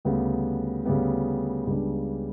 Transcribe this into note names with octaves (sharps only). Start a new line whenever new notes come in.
D2 C#3 G3 B3
D2 C#3 G3 B3
C#2 C#3 G3 B3 D4